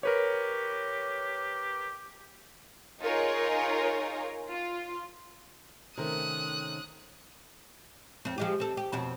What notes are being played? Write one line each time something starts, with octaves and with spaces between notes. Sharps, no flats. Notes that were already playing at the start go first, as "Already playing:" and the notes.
G4 A#4 B4 C#5
D#4 F4 G#4 A#4 C#5
F4
C3 D#3 A3 C#4 A#4 C5 D#6 F#6
F2 C4
F3 G#3 G4
C4 A4
G4
F2 B2 C4